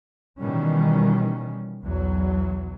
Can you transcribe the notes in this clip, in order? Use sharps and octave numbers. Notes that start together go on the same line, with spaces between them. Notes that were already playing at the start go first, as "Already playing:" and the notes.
B2 D#3 E3 G3 C#4
B1 E2 F#3